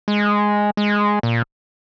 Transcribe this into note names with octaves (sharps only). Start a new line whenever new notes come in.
G#3
G#3
A#2